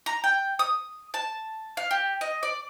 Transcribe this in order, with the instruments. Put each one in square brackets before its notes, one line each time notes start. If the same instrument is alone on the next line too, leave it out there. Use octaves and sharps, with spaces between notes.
[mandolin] A#5
G5
D#6
A5
F5
G4
D#5
D5